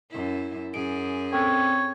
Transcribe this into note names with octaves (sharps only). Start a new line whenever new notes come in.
F#2 E4
F#2 G#4 D7
C4 A4 C#5 G5